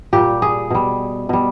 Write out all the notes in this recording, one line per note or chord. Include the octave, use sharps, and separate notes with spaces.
A#2 G3 G4
G#4
B2 G3
B2 G3